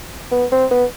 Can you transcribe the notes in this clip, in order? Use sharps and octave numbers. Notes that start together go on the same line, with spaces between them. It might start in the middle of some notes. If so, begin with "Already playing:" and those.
B3
C4
B3